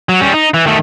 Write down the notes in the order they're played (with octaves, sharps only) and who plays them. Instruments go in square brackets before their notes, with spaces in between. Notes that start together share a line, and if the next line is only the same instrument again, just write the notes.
[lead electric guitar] F#3
G3 C#4
D#4
E3
D#3 A3